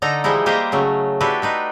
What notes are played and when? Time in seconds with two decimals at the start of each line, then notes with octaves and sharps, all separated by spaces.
0.02 D3 D#4 A4 A#5
0.24 E3 F3 G3 G#3 D#4 E4
0.46 A#3 G4 C5 D#5 E5 A#5
0.72 C#3 F#3 A3
1.20 D4 E4 F#4 G4 A4 B4
1.42 D4 D#4 B4